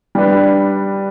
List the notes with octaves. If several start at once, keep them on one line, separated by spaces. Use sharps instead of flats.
G3 D4 G4 B4